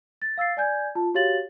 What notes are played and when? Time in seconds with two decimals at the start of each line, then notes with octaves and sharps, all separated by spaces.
0.22 A6
0.38 F5 E6 A6 C7
0.57 D5 G#5 G6 G#6
0.95 F4 A5
1.14 F#4 G4 C#5 F5 A6 F#7